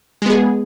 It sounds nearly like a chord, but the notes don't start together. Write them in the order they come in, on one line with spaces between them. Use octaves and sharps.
G#3 B3 G#4